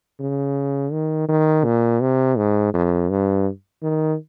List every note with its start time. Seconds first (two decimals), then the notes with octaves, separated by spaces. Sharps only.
0.20 C#3
0.93 D#3
1.29 D#3
1.65 A#2
2.01 C3
2.38 G#2
2.74 F2
3.10 G2
3.83 D#3